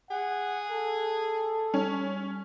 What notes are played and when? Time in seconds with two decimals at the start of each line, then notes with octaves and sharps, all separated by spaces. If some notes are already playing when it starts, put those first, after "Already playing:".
0.10 G#4 F#5
0.71 A4
1.74 G3 C#4